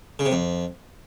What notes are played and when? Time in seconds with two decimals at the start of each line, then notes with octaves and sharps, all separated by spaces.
0.19 C#3
0.26 C3
0.32 F2